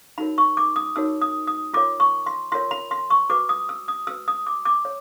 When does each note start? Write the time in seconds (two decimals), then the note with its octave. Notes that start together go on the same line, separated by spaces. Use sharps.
0.18 D#4 F#4 A#4 C#5 B5
0.38 C#6
0.57 D6
0.76 D#6
0.96 D#4 F#4 A#4 C#5 E6
1.21 D#6
1.47 D#6
1.73 F4 A#4 C#5 D6
2.00 C#6
2.26 C6
2.52 F4 A#4 C#5 C6
2.71 B5
2.91 C6
3.10 C#6
3.30 F#4 B4 D6
3.49 D#6
3.69 E6
3.88 D#6
4.07 F#4 B4 E6
4.28 D#6
4.47 D6
4.65 D6
4.85 C#5